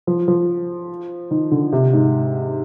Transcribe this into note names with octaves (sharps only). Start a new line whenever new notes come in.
F3
F3
D#3
D3
C3
G#2